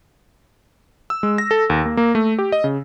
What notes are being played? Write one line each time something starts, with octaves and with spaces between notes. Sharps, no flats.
E6
G#3
A#6
A4
D#2
A#3
A#3
A3
G4
D#5
C#3